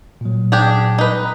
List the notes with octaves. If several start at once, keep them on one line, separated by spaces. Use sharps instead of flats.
A#2 F#3
D4 G4 G#4
D#4 B4